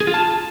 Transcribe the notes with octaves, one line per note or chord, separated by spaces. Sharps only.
G#4
F4
A5